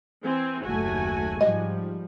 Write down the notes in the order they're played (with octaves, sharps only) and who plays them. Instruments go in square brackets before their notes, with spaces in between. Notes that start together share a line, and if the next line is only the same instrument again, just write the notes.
[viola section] E3 C4 G#5
[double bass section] F#1 D#2 A3 [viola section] F#4 G#5
[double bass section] G#2 F3 G3 [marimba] D#5